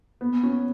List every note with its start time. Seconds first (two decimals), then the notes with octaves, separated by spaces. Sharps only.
0.21 B3
0.43 C#4